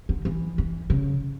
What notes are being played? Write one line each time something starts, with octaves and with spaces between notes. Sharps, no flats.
D3
E3
E3
C#3